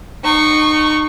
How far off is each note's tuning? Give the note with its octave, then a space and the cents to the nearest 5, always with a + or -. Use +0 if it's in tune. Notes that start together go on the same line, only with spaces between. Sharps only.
D#4 -30 C#6 +0